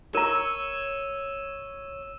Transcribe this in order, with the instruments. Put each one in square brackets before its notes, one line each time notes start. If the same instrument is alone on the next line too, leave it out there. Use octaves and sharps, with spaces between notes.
[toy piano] A#4 A#5 [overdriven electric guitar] C#5 [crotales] E6 D#7 E7